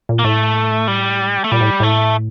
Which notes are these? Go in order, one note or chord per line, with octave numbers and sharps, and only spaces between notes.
A#2
A#3
A2 A3
G3
A3
A#2 G3
A2
A2 A3